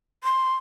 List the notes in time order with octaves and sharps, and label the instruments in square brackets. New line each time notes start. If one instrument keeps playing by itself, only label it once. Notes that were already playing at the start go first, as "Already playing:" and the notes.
[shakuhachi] C6